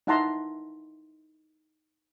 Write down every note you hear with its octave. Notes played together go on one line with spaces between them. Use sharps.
D#4 E4 F#5 A5 A#5 C6